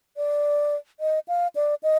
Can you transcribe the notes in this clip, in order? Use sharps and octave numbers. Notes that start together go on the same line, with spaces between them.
D5
D#5
F5
D5
D#5